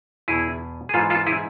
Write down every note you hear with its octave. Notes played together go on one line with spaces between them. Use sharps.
E2 B2 E4 G#4
G#4
G#2 E3 F4 A4
F4 A4
E4 G#4